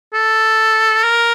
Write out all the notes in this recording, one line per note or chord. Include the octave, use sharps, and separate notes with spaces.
A4
A#4